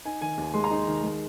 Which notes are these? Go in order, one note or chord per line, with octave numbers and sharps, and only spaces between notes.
D#4 G#5
D#3 G#5
D#2
G#3 C6
A#5
D#4 C6
D#3
G#3